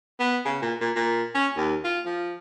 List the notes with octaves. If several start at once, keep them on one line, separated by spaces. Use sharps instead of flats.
B3
C#3
A#2
A#2
A#2
C#4
D#2
F4
F3